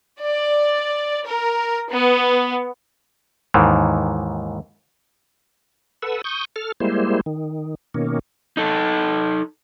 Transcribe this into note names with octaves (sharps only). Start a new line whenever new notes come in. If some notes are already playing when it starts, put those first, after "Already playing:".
D5
A#4
B3
D#2 G#2 D#3 E3
A4 B4 F#5 E6
C#6 D#6 G6
A4 F6
G3 G#3 A#3 E4 C5
D#3
B2 D#3 A#3 C#4
D#4 A4